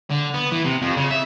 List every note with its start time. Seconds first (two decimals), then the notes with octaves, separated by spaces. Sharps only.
0.11 D3
0.35 B3
0.52 E3
0.65 C3
0.82 F2
0.97 C#3
1.11 E5